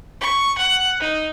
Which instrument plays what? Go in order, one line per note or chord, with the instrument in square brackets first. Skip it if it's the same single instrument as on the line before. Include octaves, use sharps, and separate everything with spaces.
[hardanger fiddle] C#6
F#5
D#4